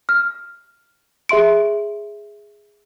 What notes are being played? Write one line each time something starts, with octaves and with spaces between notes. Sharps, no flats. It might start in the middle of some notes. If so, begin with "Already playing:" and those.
F6
G#4 E5 C6 D7